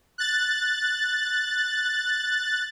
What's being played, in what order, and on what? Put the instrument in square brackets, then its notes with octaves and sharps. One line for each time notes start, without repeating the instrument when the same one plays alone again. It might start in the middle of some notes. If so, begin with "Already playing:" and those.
[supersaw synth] F#6 A6